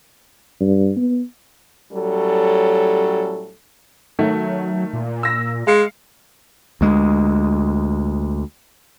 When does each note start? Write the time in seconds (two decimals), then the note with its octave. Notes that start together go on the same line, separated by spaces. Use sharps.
0.61 G2
0.96 B3
1.92 A2 F#3 G3 C#4 A4
4.19 D#3 F#3 A3
4.93 A#2
5.23 E6 A#6
5.67 G#3 F5 C#7
6.81 D2 G#3